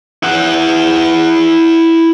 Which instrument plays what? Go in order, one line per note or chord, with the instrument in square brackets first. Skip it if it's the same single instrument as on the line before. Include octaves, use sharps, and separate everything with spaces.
[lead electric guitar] E4 F#5